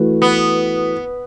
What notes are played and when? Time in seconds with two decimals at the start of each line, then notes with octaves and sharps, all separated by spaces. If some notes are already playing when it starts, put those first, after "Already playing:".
Already playing: E3 A3 F#4 B4
0.22 B3